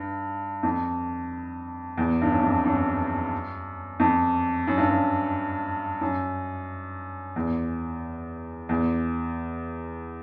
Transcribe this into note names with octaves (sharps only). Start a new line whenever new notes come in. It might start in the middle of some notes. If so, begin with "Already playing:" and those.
Already playing: G2
F2
E2
G2
F#2
F2
F#2
F2
F#2
G2
F#2
F#2
E2
E2